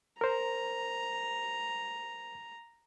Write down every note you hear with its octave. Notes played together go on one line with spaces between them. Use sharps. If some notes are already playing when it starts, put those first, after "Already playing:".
A#4 C5 A#5